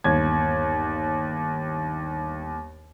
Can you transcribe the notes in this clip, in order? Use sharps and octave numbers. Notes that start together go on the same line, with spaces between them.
G1 D#2 G#6